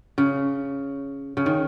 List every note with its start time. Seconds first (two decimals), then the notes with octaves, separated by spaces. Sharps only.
0.18 C#3
1.37 C#3
1.46 D#3